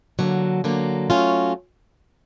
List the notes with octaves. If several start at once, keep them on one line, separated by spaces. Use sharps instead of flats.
D3 F#3 A#3
D3 F#3 A#3
F#3 A3 C#4 F4